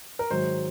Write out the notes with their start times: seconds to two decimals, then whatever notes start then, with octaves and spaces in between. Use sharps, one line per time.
0.19 A#4
0.31 G#2 D#3 F#3 C5